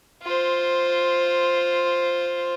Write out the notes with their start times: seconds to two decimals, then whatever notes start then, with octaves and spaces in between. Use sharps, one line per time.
0.22 F4 C5